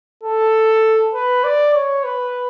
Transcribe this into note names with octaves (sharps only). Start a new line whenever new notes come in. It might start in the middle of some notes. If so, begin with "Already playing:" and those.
A4
B4
D5
C#5
B4